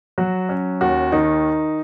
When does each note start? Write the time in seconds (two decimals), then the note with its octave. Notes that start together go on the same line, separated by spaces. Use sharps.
0.18 F#3 F#4
0.49 C#4
0.81 D#2 F#4
1.12 D#3 D#4